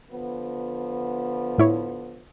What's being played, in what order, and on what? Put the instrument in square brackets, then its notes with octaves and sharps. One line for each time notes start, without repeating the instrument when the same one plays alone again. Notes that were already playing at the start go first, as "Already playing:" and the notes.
[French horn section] D3 F3 B3
[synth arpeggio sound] A2 E4 C#5